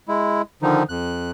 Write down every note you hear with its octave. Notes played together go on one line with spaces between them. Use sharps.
G#3 E4
D3 D#3 F3 D#4
F2 F#6